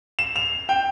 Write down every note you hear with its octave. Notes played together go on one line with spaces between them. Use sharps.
E7
F7
G5